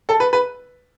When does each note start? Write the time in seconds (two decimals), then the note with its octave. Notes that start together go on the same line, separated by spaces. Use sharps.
0.09 A4
0.20 B4
0.33 B4